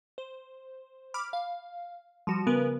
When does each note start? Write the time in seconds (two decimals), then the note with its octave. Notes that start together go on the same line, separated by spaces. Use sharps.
0.18 C5
1.14 B5 D6 F6
1.33 F5
2.27 F3 G3 F#4
2.47 C#3 B3 A#4 B4